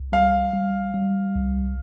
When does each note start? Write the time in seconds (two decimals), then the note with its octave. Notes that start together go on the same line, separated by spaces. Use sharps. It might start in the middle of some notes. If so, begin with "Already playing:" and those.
Already playing: C2
0.12 G3 F5
0.53 G3
0.94 G3
1.35 C2